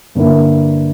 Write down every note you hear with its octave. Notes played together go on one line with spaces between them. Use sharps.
G2 D3 A#3 E4